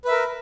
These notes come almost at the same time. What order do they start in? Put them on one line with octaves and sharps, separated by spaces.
B4 E5 A#4